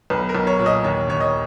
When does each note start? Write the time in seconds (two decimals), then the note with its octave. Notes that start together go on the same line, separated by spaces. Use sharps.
0.10 B1 B4
0.29 A#4
0.35 B1
0.47 C#5
0.59 A#2
0.66 D#5
0.84 D#2 C#5
1.08 D#2 C#5
1.20 D#5